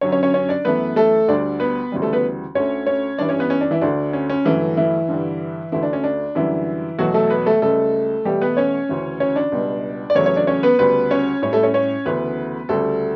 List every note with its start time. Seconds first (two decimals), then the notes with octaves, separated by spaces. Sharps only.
0.01 F#2 D3 F#3 C#4 C#5
0.12 C#4 C#5
0.23 C#4 C#5
0.34 C#4 C#5
0.49 D4 D5
0.65 F#2 E3 A3 B3 B4
0.96 A3 A4
1.28 D2 D3 G3 D4 D5
1.60 B3 B4
1.92 D2 C#3 E3 G3
2.02 A3 A4
2.13 B3 B4
2.55 D2 D3 A3 C#4 C#5
2.86 C#4 C#5
3.18 G2 E3 G3 D4 D5
3.29 C#4 C#5
3.40 B3 B4
3.50 C#4
3.61 D4
3.71 E3 E4
3.81 D2 D3 A3 D4
4.13 C#4
4.30 C#4
4.45 G2 D3 E3 F#3 A3 E4
4.77 E3 E4
5.08 G2 D3 G3
5.72 D2 D3 E3 A3 E4
5.83 D4
5.93 C#4
6.04 D4
6.35 F#2 D3 E3 G3 E4
6.98 E2 B2 F#3 A3 F#4
7.14 A3 A4
7.30 B3 B4
7.46 A3 A4
7.62 C#2 C#3 G3 A3 A4
8.25 E2 B2 G3 A3 G4
8.41 B3 B4
8.57 C#4 C#5
8.89 D2 C#3 E3
9.20 C#4 C#5
9.36 D4 D5
9.52 C#2 B2 G3
10.10 D5
10.15 E2 C#3 F#3 A3 C#4 C#5
10.26 C#4 C#5
10.36 D4 D5
10.47 C#4 C#5
10.63 B3 B4
10.79 D2 C#3 G3 B3 B4
11.11 C#4 C#5
11.42 A2 G3 C#4 C#5
11.53 A3 A4
11.63 C#4 C#5
11.74 C#4 C#5
12.05 D2 C#3 E3 A3 B3 B4
12.69 D2 C#3 G3 A3 A4